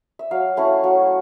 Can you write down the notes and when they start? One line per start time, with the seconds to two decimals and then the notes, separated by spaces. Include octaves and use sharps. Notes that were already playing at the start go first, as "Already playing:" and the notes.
0.19 E5
0.31 F#3 F5
0.57 A3 C#4 E4
0.84 F#3